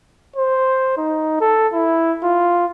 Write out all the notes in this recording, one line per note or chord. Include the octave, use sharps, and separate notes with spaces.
C5
D#4
A4
E4
F4